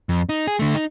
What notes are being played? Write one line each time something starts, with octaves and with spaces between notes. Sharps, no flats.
F2
D#4
G#4
D3 A3
D#4